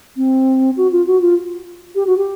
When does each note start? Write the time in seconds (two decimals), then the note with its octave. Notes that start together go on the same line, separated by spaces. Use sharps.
0.17 C4
0.77 F#4
0.92 F4
1.07 F#4
1.21 F4
1.95 G4
2.07 F#4
2.18 G4